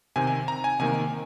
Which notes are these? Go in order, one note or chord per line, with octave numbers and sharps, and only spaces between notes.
C3 D#3 C4 G#5
G#5
A#5
G#5
C3 D#3 A#3 G#5